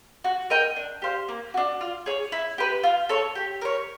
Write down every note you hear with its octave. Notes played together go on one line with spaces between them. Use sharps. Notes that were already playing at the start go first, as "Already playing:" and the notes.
F#4
A#4 D#5 G5
D4
G4 C5 F5
A#3
D4 F#4
F4
G#4 C#5
E4
G4 B4
F4
A4 C#5
G4
A#4 C#5